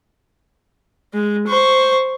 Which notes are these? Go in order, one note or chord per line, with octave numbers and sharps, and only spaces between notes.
G#3
C5 C#6